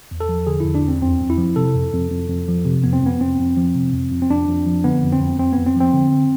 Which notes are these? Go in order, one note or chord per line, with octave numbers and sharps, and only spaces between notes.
E2
A4
F3
D3 G#4
E2 E4
D4
E2 C4
F2 C4
F2
E4
F3
C3 A4
F2
F2
F2
F2
F3
C3
F2 B3
C4
F2 B3
F2 C4
F2
F3
C3
F2
F2
C4
F2 D4
F2
F3
D3 B3
F2
C4
F2
F2 C4
B3
F2
C4
F3 C4
D3